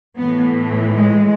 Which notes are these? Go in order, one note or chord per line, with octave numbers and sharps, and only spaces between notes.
A2 E3 B3
G#3